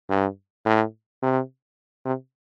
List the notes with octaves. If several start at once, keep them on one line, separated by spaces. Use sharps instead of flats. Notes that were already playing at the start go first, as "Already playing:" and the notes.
G2
A2
C3
C3